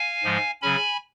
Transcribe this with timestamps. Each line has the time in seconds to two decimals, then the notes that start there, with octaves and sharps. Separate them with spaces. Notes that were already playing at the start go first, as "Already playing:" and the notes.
Already playing: F5 G#5
0.24 G#2 F3 G#3
0.62 C#3 F#3 C#4 G#5 B5